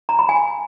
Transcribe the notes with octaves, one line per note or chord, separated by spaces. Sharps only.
A#5
B5
G#5